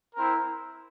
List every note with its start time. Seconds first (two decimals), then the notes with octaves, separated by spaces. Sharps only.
0.16 C4 E4 A#4